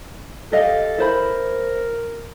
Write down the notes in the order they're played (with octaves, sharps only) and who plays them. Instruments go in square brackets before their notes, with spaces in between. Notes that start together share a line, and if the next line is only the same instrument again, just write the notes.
[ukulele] G4 D#5 F5 [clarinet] A4
[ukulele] E4 C5 B5 [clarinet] A#4